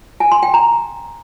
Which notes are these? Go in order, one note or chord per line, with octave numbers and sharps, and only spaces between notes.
G#5
C6
G5
A#5